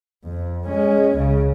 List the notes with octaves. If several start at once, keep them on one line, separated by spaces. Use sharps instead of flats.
F2
G#3 C#4
C#2 C#3